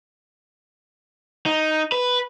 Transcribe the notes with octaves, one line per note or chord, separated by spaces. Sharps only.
D#4
B4